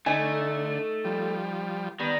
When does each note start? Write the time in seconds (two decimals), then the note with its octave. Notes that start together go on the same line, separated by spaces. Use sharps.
0.06 D3 A3 D#4 G#5
1.04 F3 G3
2.00 D#3 G3 B3